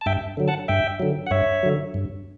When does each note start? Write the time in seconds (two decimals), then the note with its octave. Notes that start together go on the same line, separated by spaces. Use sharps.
0.01 A5
0.06 G2 E5 G5
0.37 D3 F#3
0.48 F#5 A5
0.68 G2 E5 G5
1.00 D3 F#3
1.27 F#5
1.31 G2 C#5 E5
1.63 D3 F#3
1.94 G2